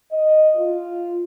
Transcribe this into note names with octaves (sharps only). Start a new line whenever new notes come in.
D#5
F4